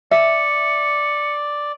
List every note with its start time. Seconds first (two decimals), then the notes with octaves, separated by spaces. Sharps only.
0.11 D5 E5 C#7